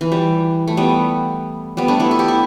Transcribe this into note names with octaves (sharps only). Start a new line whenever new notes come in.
E3
G3
A3
G3 B3
G3 B3
A3 D4
B3 E4
A4
G4
E4